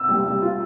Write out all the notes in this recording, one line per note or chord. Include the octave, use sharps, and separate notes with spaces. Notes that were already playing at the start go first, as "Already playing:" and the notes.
Already playing: E6
G3
G3
F4